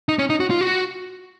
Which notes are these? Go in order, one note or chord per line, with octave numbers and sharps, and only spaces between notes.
D#4
C#4
D#4
F#4
F4
F#4